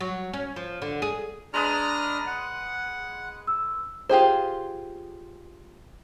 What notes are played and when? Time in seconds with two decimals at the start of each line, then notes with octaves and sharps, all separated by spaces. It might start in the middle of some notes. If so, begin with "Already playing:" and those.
0.01 F#3
0.33 C#4
0.56 F3
0.82 D3
1.02 G#4
1.54 G#3 D4 B4 A#5 D#6 F6
2.27 F#5
3.47 E6
4.09 F4 G4 G#4 C5